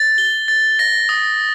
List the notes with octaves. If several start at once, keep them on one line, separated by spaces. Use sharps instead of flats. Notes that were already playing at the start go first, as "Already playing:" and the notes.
Already playing: A6
G7
A6
A#6
D#6